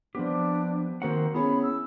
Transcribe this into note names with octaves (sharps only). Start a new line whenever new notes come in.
F3 B3 C4 D4 G4 C5
D#3 A#3 C4 F#4 A#4 C5 F#5
B3 C#4 E4 G#4 B5
E6